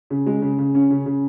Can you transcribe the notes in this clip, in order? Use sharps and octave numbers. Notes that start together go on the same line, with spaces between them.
C#3
G#3
C#3
C#3
C#4
C#3
C#3